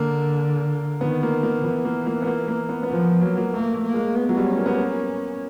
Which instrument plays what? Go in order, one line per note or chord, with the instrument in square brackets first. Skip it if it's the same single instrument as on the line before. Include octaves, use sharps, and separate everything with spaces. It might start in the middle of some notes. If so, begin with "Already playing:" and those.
Already playing: [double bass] D3 [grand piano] A#3
[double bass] D#3 [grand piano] B3
[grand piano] A#3
A#3
[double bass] E3 [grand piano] B3
[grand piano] A#3
A#3
B3
A#3
A#3
B3
B3
[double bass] F3 [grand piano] A#3
[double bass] F#3 [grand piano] A#3
[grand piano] A#3
[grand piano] A3 [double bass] A#3
[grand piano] A3
[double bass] A#3
[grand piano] G#3
[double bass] B3
[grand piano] F#3
G3
[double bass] C#4
[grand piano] A#3
B3
A#3